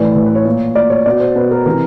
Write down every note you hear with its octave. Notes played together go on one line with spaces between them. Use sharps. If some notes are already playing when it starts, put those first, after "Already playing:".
Already playing: A2 E3 D5
A2 E3
B4
C#5
A#2
A#2 D5
C#5
B2 D5
C5
B2 B4
A#4
C3 E3 A#4